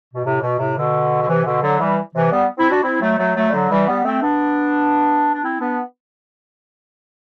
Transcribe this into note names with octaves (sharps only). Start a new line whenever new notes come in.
B2
A2 C3
B2
A2 C3
B2 D3
D3
C3 E3
B2 D3
D3 F#3
E3 G3
C3 E3
G3 B3
C4 E4
D4 F#4
C4 E4
F#3 A3
F#3 A3
F#3 A3
G3
D3 F#3
E3 G3
G3 B3
A3 C4
B3 D4
D4
C4 E4
B3 D4